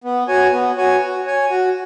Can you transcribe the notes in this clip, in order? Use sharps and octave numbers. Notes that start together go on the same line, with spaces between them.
B3
F#4 C#5 G#5
B3
F#4 C#5 G#5
F#4
C#5 G#5
F#4